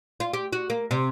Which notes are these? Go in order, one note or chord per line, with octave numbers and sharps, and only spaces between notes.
F4
G4
F#4
A#3
C3